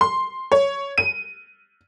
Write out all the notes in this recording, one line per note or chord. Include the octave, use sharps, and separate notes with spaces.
C6
C#5
D#7